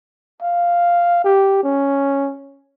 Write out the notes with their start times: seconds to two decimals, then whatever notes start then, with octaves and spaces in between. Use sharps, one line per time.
0.42 F5
1.24 G4
1.63 C#4